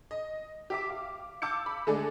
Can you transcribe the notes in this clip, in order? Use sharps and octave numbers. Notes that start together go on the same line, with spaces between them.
D#5
G4 E5 D6
F5
F5 A5 D6 E6 G6 C#7
B5
D3 G#3 A3 G#4 A4 D5